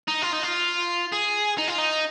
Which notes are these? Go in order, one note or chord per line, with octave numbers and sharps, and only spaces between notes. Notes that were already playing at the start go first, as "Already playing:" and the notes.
D#4
F4
D#4
F4
G#4
D#4
F4
D#4